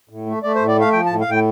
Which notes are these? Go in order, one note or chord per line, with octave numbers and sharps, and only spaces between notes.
A2
A3
A3 D5
C5
A2
D5
A3 F5
F3 G5
A5
A2
F5
A2 G5